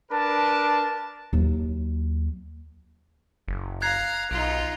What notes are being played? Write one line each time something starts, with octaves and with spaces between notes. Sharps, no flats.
D4 A#4 B4 A5
D#2 F#3
F#1
F5 A#5 F#6 G#6 C7
B1 D#4 F4